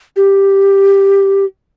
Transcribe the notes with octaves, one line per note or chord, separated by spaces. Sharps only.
G4